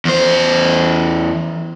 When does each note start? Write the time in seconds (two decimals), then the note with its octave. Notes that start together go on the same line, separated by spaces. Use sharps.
0.05 E2 C5